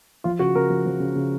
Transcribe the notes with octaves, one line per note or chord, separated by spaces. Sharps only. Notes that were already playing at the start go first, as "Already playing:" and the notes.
F3 F4
C#3 F#4
C#3 A#4
F3
F3
C#3
C#3